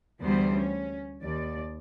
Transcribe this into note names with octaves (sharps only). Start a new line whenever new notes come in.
D2 E3 G3 B3 C5
C#4
D#2 D5